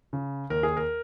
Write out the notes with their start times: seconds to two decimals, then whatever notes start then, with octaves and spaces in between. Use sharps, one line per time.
0.13 C#3
0.50 D#2 A#4
0.63 G#4
0.77 A#4